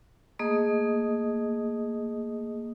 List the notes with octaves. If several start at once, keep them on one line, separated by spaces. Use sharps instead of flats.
A3 A#3 G#4 D#5 D#6